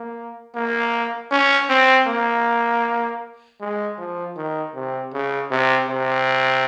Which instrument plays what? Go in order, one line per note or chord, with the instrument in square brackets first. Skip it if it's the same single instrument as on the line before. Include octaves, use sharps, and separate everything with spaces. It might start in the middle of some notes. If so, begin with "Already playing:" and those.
Already playing: [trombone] A#3
A#3
C#4
C4
A#3
G#3
F3
D#3
C3
C#3
C3
C3